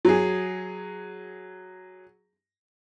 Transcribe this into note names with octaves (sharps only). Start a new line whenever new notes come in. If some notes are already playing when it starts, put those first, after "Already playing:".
F#3 G#4